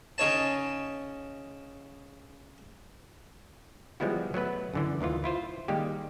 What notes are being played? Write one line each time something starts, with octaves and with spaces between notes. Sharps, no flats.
C#3 D#4 C#5 A5
F3 G3 G#3 B3 E4 F#4
F#3 A3 B3 B4
F#2 D3 E3
D2 D#3 E3 F4
E4 F4 C5
D#3 G3 G#3 A#3 G4